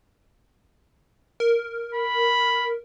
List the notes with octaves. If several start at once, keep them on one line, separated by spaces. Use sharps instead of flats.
A#4
B5